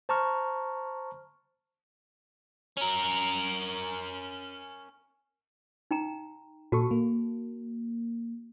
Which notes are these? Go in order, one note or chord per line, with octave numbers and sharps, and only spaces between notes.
C5 A5 A#5 C#6 F6
C#4 A#4
D#4 G5 A#5
A#2 F#4 A4 A5 C#6
A#3